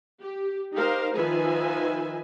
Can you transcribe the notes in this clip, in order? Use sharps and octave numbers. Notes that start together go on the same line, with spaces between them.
G4
D#4 G4 A#4 C5 F5
D#3 F3 F4 B4 E5 G#5